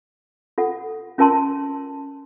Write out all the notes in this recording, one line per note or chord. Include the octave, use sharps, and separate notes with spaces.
F4 A4 F#5
C#4 F4 A#4 G#5 A5 C6